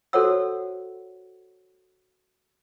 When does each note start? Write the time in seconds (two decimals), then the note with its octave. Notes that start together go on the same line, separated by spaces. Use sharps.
0.13 F#4 A4 C5 C#5 F#5 E6